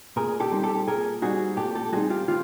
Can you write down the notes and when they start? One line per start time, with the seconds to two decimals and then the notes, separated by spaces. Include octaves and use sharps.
0.16 A#2 G#4 A#4
0.40 G4 A4
0.52 G3 C4 D#4
0.63 G4 A4
0.87 A#2 G#4 A#4
1.22 G3 C4 D#4 F#4 G#4
1.57 A#2 G4 A4
1.75 G4 A4
1.92 G3 C4 D#4 F#4 G#4
2.10 F4 G4
2.28 E3 F4 G4